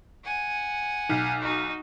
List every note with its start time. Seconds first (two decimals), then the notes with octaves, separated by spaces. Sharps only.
0.24 F#5 G#5
1.09 B1
1.42 D#4 F#4